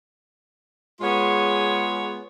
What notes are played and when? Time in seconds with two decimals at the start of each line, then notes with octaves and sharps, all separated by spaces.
1.01 G#3 B3 F4 G#4 C#5